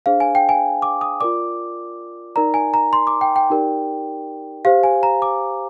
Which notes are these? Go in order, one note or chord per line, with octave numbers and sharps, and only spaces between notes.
D4 G#4 C5 F5
G#5
G5
G#5
D6
D#6
F4 A#4 D5 D6
D#4 A#4 D5 A#5
G#5
A#5
C6
D6
G5
G5
D#4 G4 A#4 D5
G4 C5 F5
G#5
A#5
D6